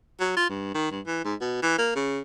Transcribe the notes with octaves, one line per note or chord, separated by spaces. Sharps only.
F#3
F4
G2
D#3
G2
E3
G#2
B2
E3
A#3
C#3